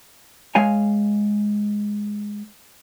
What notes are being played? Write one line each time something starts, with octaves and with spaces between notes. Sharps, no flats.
G#3 C#5 F5 G#5